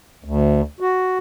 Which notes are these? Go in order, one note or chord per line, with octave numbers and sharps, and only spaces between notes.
D2
F#4